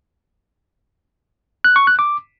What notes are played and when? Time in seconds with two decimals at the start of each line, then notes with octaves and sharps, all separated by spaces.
1.64 F#6
1.76 C#6
1.87 F#6
1.99 D6